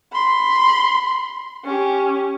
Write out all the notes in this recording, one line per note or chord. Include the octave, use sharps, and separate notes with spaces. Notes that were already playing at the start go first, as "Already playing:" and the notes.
B5 C6
C#4 G4